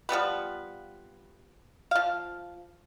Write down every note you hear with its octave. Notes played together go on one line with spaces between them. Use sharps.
F3 G3 B3 B4
F3 F5